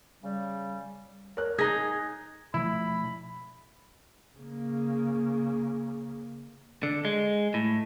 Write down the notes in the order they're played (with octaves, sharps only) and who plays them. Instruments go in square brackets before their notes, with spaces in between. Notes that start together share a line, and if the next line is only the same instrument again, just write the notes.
[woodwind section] C#3 G3
[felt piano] A#4 C#5 F#6
[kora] D#4 G#4 [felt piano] G#6 A#6
[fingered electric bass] B2 F3 A3 [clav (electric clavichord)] E4 [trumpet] B5
[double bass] C#3 A#3
[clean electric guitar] D3
G#3
A2